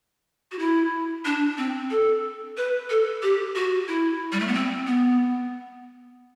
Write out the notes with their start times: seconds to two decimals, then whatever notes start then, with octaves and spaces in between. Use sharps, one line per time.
0.52 F#4
0.59 E4
1.25 D4
1.58 C4
1.91 A4
2.57 B4
2.90 A4
3.22 G4
3.56 F#4
3.88 E4
4.32 G3
4.40 A3
4.47 B3
4.54 C4
4.87 B3